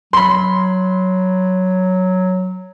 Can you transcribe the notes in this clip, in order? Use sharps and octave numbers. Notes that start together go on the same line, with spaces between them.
F#3 B5 C6